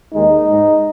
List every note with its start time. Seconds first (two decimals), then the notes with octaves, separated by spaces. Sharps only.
0.14 D#2 D#3 G#3 D#4
0.48 G#2 G#3